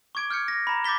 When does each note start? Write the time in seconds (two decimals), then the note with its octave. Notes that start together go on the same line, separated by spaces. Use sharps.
0.15 C#6 D6 G#6 D7
0.29 D6 F6 G6 G#6 C#7
0.48 A#6
0.67 A#5 B5
0.84 D6 G6 A6 B6 G7